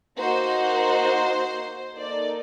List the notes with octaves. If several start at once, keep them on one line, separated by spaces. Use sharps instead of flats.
A#3 D#4 F#4 C5
A#3 D#4 A4 D5